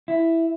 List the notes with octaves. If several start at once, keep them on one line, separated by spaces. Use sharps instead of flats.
E4